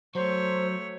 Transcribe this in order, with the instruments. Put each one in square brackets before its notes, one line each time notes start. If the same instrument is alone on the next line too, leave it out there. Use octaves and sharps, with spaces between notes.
[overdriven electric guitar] F#3 [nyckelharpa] A3 C#5 [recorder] C5